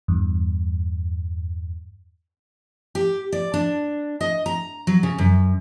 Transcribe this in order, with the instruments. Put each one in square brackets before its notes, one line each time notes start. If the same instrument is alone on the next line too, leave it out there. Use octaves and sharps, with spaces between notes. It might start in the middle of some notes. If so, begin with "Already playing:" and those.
[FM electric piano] E2 G2
[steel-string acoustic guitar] G4
D5
D4
D#5
A#5
F#3
C#3
F#2